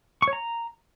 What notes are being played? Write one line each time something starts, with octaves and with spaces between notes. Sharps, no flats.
C#6
C#5
A#5